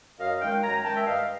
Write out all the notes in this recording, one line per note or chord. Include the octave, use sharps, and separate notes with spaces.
F#2 D#5 F5
D#3 G#3 F5 G5
F#2 G#5 A#5
D#3 G#3 G5 A5
E5
G2 D#5 F5